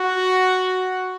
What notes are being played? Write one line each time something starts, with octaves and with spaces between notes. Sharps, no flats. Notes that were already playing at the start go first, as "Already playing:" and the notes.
Already playing: F#4